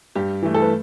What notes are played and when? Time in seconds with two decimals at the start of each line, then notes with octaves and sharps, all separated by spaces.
0.15 G2 G4
0.42 E3 A3
0.54 A4
0.62 B4